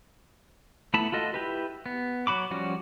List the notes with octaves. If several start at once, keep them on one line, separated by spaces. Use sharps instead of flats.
A3 B3 E4 A5 B5
F4 F#4 A4 D#5
E4 G4 B4
B3
F#3 F#4 B5 D6
F3 G3 C#4 F#4